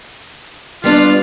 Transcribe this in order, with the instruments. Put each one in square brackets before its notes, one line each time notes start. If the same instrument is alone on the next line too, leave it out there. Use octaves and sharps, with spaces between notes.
[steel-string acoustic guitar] G3 B3 D4 [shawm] F4